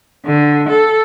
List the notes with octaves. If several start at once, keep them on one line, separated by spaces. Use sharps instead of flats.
D3
A4